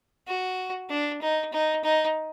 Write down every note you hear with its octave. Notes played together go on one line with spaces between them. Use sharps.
F#4
D4
D#4
D#4
D#4